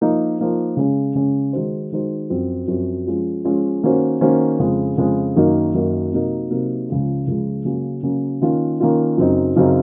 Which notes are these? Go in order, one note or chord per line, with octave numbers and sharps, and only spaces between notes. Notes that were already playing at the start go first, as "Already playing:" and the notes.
F3 A#3 D#4
F3 A#3 D#4
C#3 G#3 C#4
C#3 G#3 C#4
D#3 G#3 D#4 F#4 C5
D#3 G#3 D#4 F#4 C5
F#2 F3 C4 F#4
F#2 F3 C4 F#4
F3 G#3 C#4 F4
F3 G#3 C#4 F4
D#3 A#3 C#4 F#4 C5
D#3 A#3 C#4 F#4 C5
F2 C#3 G#3
F2 C#3 G#3
F#2 D#3 F#3 A#3 D#4
F#2 D#3 F#3 A#3 D#4
C3 F#3 A#3 D#4 A#4
C3 F#3 A#3 D#4 A#4
C#2 C#3 F3 G#3
C#2 C#3 F3 G#3
C#3 F#3 A#3 C#4 F#4
C#3 F#3 A#3 C#4 F#4
D#3 A#3 C#4 F4
D#3 A#3 C#4 F4
F#2 C#3 F#3 C4 D#4
F#2 C#3 F#3 C4 D#4